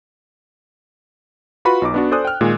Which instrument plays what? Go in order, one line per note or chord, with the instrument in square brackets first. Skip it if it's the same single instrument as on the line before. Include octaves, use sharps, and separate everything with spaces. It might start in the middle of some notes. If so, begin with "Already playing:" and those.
[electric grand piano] F4 F#4 B4 B5 C#6
B1 D#4 D6
B3 D4 F#4
A4 C5 D5 G#5 D#6 F#6
G5 F6
A#2 D#3 G#3